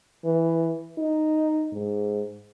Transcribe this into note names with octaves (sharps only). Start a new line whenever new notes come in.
E3
D#4
G#2